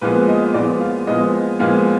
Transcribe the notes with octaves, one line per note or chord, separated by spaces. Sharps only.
A#2 F3 G#3 B3 B4
D#5
A#2 F3 G#3 B3 D5
F5
A#2 F3 G#3 B3 D#5
A#2 F3 G#3 B3 F5